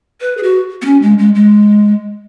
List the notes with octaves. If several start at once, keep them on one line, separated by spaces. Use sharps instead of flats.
B4
G#4
F#4
B3
C#4
G#3
G#3
G#3